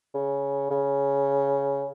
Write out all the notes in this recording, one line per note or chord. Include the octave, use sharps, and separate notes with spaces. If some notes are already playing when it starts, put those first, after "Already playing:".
C#3
C#3